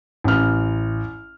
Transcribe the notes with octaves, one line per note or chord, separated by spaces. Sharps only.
A1 F6